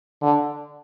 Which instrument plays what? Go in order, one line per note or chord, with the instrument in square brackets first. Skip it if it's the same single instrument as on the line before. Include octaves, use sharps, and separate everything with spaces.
[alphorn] D3